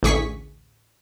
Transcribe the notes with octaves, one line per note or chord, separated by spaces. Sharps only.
A1 D2 G#4 C#6 B6